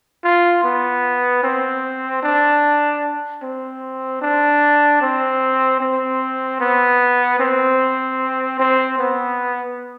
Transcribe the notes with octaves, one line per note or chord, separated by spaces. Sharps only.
F4
B3
C4
D4
C4
D4
C4
C4
B3
C4
C4
B3